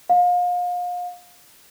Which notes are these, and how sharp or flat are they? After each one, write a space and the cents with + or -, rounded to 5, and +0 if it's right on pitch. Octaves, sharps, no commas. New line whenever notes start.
F5 +35